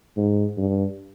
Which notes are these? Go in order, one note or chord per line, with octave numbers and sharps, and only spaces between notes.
G#2
G2